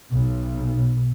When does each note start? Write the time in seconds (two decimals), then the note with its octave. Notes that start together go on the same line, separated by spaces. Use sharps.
0.11 B1